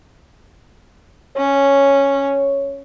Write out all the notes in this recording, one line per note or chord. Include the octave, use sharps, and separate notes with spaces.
C#4 C#5